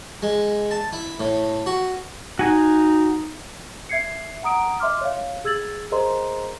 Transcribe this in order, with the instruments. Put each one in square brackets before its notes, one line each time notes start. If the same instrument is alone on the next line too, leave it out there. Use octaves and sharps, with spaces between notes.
[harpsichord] G#3
A5
E4
A2
F#4
[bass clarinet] D#4 [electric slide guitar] F#4 G#5
[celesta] E5 G#6 C7 C#7
F#5 A#5 D#6 D7
D#5 E5 C6 D6 F6
C#5 F5
G#4 E6 G#6 A6 F#7
G#4 A#4 C5 D#5 A#5 C6